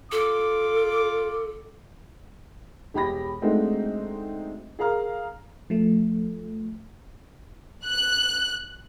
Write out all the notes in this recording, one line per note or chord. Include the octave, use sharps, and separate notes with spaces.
F4 A4 D6
E1 G4 B5 A#6
G#3 A3 C4 D4 D#4 F#4
G#4 A#4 F5 A#5 F6
F3 A3
F#6